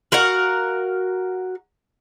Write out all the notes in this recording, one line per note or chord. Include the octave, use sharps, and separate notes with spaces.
F#4 A#4 F5 F#5